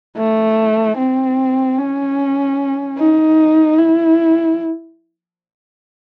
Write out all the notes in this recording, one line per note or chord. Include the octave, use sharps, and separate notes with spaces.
A3
C4
C#4
D#4
E4